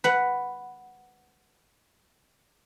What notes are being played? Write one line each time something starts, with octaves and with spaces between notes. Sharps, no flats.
B4 F#5